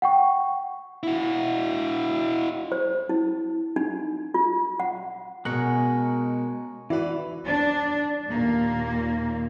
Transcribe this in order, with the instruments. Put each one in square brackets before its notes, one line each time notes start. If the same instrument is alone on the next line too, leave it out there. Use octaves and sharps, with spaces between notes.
[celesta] F#5 G5 C#6
[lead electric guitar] E4 F#4
[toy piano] C5
E4
D#4
F4
F#5
[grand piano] B2 [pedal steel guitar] G#3 A#4 F#5 [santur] C#4 C#5 D#5 [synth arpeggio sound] F#6
[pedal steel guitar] E3 [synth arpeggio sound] E4 F#4 [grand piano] B4 D5
[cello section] D4
D#2 A#2 A#3